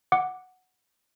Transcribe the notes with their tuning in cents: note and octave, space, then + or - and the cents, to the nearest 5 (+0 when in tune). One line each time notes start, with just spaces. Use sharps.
F#5 +0 D6 +0